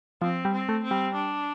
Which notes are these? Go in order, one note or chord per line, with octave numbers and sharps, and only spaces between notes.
F3 C4
G3
C4
A3
C4
G3
D4